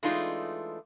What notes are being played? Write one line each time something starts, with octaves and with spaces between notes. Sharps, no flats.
E3 G#3 A3 D4 D#4 F4